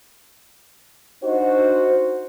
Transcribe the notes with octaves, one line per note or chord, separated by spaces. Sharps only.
D4 D#4 F#4 C5